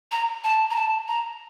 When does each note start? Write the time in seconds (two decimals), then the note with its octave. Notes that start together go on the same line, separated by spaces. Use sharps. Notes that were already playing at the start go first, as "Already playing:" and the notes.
0.12 A#5
0.44 A5
0.70 A#5
0.76 A5
1.08 A#5